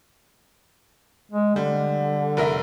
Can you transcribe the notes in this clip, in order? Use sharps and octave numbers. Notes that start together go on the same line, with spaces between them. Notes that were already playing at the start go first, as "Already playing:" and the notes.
G#3
D3 G3
F1 A#4 E5